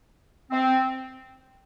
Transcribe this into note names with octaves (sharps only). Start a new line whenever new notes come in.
C4